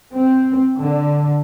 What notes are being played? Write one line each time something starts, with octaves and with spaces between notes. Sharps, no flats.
C4
D3